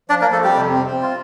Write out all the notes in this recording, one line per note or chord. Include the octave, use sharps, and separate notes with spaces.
F3 D4 D5
A#3 A#4
F3
A3 A4
F2 G3 G4
C3
C4
C4
F4